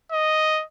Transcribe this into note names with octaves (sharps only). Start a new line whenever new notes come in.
D#5